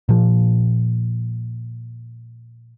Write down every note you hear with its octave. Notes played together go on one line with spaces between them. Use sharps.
A#2 F3